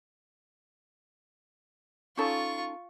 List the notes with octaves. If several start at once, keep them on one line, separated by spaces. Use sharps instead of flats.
C#4 D#4 F4 A4 C#6